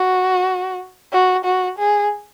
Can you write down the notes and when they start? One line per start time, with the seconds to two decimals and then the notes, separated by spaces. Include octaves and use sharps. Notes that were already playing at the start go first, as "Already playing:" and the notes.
Already playing: F#4
1.12 F#4
1.45 F#4
1.79 G#4